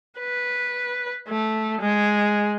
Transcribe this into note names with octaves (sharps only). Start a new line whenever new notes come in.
B4
A3
G#3